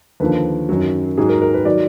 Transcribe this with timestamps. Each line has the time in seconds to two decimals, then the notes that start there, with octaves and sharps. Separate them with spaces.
0.20 D#2 D3 F3 B4
0.69 F#2 D#3 F#3
1.17 G#2 F#3 G#4
1.29 A#4
1.42 A#4
1.54 B4
1.65 D#3 F#3 D5